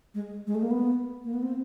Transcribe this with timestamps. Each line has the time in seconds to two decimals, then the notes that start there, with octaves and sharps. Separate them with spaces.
0.14 G#3
0.31 G#3
0.47 G#3
0.55 A3
0.63 A#3
0.71 B3
1.25 A#3
1.34 B3
1.43 C4